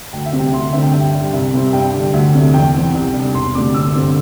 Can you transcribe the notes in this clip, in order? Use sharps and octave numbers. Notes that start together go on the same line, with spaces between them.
D2 G5
E5
C3 G3 C4
G5
D2 C6
D3 C4 E5
G5
G2 G5
G3 D4
C2 E5
C3 G3 C4
G2 G5
D3 G3 D4
D2 E5
C3 A3 D4
E2 G5
E3 C4
C2
C3 G3 D4
E1 C6
D2 C3 A3 D4 D6
G1 E6
G2 D3 C4